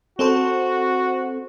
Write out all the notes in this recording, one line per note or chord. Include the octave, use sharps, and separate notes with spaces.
C4 F#4 A4 C5